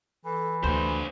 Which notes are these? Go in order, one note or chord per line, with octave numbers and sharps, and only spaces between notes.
E3 A4
D2 D4 C5 C6